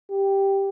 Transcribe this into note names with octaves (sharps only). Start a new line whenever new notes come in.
G4